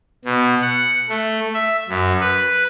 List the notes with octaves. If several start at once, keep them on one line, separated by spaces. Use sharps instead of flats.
B2
F#5
A3
E5
F#2
B4